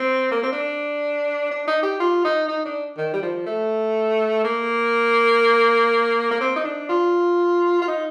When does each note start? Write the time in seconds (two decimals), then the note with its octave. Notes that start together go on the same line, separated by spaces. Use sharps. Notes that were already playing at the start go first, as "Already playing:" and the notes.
Already playing: C4
0.31 A#3
0.43 C4
0.52 D4
1.51 D4
1.67 D#4
1.83 G4
2.00 F4
2.25 D#4
2.48 D#4
2.65 D4
2.97 D#3
3.13 G3
3.22 F3
3.46 A3
4.44 A#3
6.31 A#3
6.41 C4
6.56 D#4
6.64 D4
6.89 F4
7.82 F4
7.88 D#4